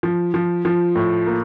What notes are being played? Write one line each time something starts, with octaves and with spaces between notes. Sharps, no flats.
F3
F3
F3
A2
A#3